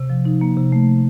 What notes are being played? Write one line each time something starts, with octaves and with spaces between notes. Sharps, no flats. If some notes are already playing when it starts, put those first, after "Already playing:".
Already playing: C3
F3
D#4
A#3
C3
A3